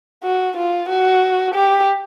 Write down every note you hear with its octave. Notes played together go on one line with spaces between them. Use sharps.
F#4
F4
F#4
G4